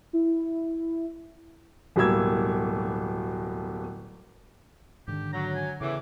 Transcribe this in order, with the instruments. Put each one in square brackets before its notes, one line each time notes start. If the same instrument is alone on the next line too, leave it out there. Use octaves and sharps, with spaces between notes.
[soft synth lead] E4
[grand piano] D1 B2 G3 A#3 E6 G#6
[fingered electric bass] G#2 D#3 [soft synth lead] D3 [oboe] G4
[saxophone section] F#3 [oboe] A#5
[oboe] G#5
[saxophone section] E2 A2 E3 [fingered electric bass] C#3 [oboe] D6